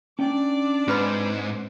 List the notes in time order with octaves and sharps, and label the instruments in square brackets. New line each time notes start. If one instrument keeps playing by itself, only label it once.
[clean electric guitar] C#4 G5 [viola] D4 D5
[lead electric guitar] G#2 [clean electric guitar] C4 [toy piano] F4 B4 B5